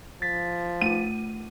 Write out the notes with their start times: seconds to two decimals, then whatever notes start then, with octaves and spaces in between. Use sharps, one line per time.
0.22 F3 A6 B6
0.81 A3 F4 D#7